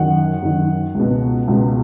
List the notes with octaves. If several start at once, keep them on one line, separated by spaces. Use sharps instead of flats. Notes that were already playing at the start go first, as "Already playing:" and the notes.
Already playing: F#2 D#3 F#5
F#2 D#3
C#2 B2
C#2 B2